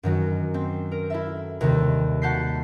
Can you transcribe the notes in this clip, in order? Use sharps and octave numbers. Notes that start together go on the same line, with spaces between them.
F#2 D#3 F#3 F#4
C4
A#4
E4 A4 E5
D#2 C3 D#3 G3
F#4 F#5 A5 G6 B6 C7